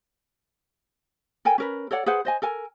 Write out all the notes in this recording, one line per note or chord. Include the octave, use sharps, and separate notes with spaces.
A4 A#4 G5 G#5
C#4 A#4 B4
A4 C#5 D5 F#5
G#4 B4 C5 F#5
C5 D#5 G#5
A4 A#4 G#5